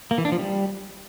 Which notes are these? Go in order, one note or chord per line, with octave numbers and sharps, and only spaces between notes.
A#3
E3
D4
F3
G3